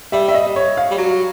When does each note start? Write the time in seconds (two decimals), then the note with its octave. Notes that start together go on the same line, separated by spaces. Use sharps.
0.12 G3 E5
0.28 E5
0.34 D#5
0.56 C#5
0.77 F5
0.91 G3
0.98 F#3